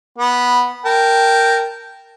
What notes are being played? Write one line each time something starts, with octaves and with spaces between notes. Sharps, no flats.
B3
A#4 G5 A5